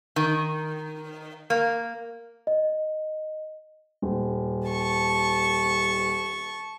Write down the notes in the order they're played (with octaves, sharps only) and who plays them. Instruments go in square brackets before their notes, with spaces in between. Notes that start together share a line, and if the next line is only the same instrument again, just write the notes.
[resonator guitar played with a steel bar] D#3
A#3
[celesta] D#5
[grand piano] D#1
[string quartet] A5 C#6